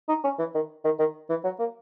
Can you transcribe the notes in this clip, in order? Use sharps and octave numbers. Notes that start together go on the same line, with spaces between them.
D#4
C#4
E3
D#3
D#3
D#3
E3
F#3
A#3